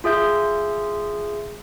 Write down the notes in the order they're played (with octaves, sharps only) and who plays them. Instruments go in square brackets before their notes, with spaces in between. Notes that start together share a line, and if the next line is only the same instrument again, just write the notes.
[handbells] F4 G#4 E5 G6